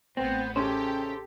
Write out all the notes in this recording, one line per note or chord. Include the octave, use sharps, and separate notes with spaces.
A1 B3 C4 C5
C#3 C#4 G4 A4 C5